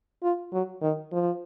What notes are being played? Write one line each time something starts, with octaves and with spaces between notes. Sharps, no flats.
F4
F#3
D#3
F3